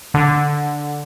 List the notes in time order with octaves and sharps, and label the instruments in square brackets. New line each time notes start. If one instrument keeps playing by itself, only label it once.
[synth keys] D3